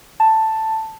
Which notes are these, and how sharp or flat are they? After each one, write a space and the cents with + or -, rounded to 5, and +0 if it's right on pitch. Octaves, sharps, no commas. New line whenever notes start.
A5 +5